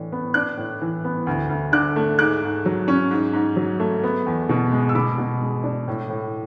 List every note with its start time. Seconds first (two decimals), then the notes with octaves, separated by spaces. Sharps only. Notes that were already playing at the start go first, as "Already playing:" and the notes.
Already playing: A2 E3 D4
0.12 B3
0.34 D4 D6 F#6
0.57 A2
0.81 E3
1.04 B3
1.27 D2
1.49 D2
1.72 D3 D6 F#6
1.96 A3
2.18 G#2 D6 F#6
2.42 G#2
2.65 F#3
2.88 C#4
3.11 G#2
3.33 G#2
3.56 F#3
3.80 A3
4.03 B3
4.26 E2
4.49 B2
4.71 G#3
4.89 E6
4.95 B2 B5 D6
5.18 B2
5.42 G#3
5.63 D4
5.88 A2
6.09 A2